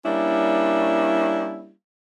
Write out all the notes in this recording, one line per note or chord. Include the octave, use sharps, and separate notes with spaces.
G3 A#3 C#4 D4 E4